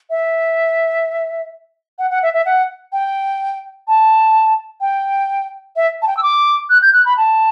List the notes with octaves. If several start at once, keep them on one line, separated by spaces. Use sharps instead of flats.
E5
F#5
F#5
E5
E5
F#5
G5
A5
G5
E5
A5
G5
E6
D6
F#6
G6
F#6
B5
A5